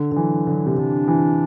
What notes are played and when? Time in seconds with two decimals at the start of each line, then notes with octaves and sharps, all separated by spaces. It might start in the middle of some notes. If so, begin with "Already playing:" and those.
Already playing: D3
0.12 D3
0.16 E3 F#3
0.47 D3 F#3
0.66 C3
0.77 D3 D4
1.08 E3